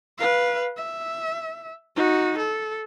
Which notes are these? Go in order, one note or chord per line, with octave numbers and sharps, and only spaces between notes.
B4 F5
E5
D#4 F#4
A4